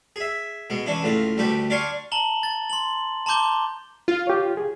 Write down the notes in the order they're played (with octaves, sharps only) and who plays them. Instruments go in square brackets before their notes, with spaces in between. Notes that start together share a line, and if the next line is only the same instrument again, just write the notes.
[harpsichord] G#4 E5
B2 G#3
E3 C#4 D4 E4
C#2 A2 F4
D2 G3 A3 G4 B4
D4 D5 F5 G#5 C6 C#6
[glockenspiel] A5 A#5 F#7 G7
A6
C6 F#7
A5 A#5 C6 D6 G6 G7
[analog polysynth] F4
[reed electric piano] G4 C#5
G#4